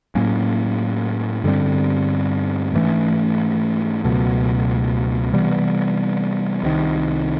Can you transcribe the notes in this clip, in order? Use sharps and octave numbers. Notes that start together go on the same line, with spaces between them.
A2 F#3 A#3 C#4
G2 D3 G3 C4
G#2 E3 A3 C#4
C#2 B2 F#3 A3
C3 E3 G3 B3
C2 C3 D#3